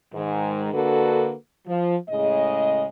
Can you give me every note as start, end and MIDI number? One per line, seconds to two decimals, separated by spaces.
0.13 0.69 44
0.13 0.69 51
0.73 1.33 50
0.73 1.33 58
0.73 1.33 62
0.73 1.33 66
0.73 1.33 69
0.73 1.33 71
1.67 1.96 53
2.09 2.86 45
2.09 2.86 49
2.09 2.86 56
2.09 2.86 75